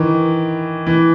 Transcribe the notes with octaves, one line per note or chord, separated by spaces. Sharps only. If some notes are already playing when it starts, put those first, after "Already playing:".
Already playing: D#3 E3
E3